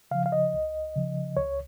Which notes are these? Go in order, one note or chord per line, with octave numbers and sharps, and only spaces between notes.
C#3 F3 F5
F5
D#5
C#2
C#3 F3
C#2 C#5